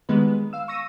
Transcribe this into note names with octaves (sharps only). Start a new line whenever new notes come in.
D#3 G3 G#3 B3 B4
F5 E6
C#6 E6 A#6 D#7